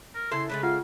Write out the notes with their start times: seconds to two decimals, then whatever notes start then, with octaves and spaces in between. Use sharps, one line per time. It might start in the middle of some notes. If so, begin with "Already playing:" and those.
0.15 A#4
0.31 C#3 E4 A4 C6
0.50 C#3 G#3 A3 B4
0.63 F4 F5 F#5